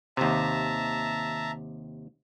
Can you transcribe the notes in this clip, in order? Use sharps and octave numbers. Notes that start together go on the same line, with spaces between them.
D#2 C3 E5 A5 A#5